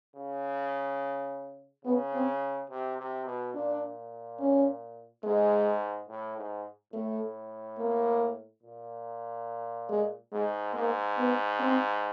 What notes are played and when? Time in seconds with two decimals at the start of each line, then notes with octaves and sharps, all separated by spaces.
0.16 C#3
1.84 C#3 B3
2.14 C4
2.70 C3
2.98 C3
3.26 B2
3.54 A#2 D4
4.40 C#4
5.24 G#2 G#3
6.08 A2
6.37 G#2
6.93 A2 A3
7.78 A#3
8.63 A#2
9.89 G#3
10.32 G#2 G#3
10.74 G#2 A#3
11.17 B3
11.60 C4